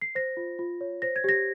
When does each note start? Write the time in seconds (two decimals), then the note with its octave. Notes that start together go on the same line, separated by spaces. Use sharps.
0.02 C7
0.15 C5 A#6
0.37 F4
0.59 F4
0.81 C#5
1.02 C5 A#6
1.16 G#6
1.24 G4 A#6